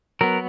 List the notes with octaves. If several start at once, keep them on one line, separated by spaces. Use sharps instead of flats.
F#3 B3 A#4